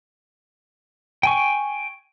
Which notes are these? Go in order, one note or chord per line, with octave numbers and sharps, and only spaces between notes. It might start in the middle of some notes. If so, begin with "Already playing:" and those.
G5 G#5 C#6